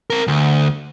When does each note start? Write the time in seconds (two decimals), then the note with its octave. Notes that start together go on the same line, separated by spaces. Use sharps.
0.10 C4 A#4
0.28 D2